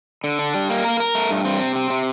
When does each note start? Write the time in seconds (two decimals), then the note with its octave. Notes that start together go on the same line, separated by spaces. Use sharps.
0.24 D3
0.39 D4
0.54 G3
0.70 A#3
0.85 A#4
1.00 A#4
1.15 A3
1.31 G2
1.45 C4
1.60 C3
1.76 C4
1.90 C3